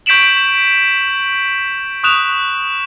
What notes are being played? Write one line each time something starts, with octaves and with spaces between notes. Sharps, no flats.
C#6 G6 B6 D7 E7 F#7
C#6 D#6 F#6 E7 F7